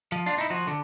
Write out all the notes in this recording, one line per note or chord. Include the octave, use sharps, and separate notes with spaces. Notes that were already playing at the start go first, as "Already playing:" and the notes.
F3
D4 F4
D#4 E4
F3 F#4
D3